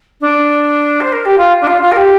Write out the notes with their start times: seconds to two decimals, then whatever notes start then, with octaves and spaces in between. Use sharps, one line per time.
0.21 D4
1.00 C5
1.12 A#4
1.25 G4
1.37 F4
1.61 D4
1.67 F4
1.82 F4
1.91 A#4
1.96 G4